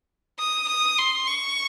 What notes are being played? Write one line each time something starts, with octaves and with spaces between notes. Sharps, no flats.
D#6
D#6
C6
C#6